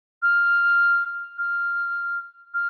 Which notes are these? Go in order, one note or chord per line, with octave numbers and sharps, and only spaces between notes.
F6
F6
F6